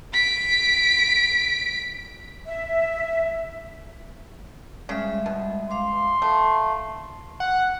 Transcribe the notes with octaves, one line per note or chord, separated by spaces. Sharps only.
B6 D7
E5
C#3 G3 G#3 E5
B2
F5 C6 D6
A3
F#5